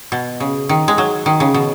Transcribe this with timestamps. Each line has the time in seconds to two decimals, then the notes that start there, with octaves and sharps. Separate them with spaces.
0.12 B2
0.40 C#3
0.69 D#3
0.88 G#3
0.98 F#3
1.26 D#3
1.40 C#3
1.54 B2